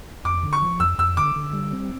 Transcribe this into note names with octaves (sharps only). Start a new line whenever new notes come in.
F2 D6
D3
C#6
F3
F2 E6
F2 E6
D3 D6
D3
G3
C4